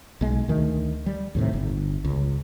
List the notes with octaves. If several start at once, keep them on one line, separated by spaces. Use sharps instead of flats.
B1 G#3
D2 D#3 A3
G3
D#2 A2 C3
G1
C#2